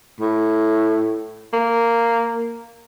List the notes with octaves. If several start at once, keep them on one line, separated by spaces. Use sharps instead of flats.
A2
A#3